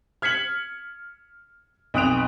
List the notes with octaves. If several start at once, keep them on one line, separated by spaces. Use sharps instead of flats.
F6 G#6 B6 C#7 F#7
B1 F2 D#6 F#6 D7 F7